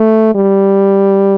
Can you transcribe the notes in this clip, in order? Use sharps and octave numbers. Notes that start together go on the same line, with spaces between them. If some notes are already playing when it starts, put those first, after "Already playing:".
Already playing: A3
G3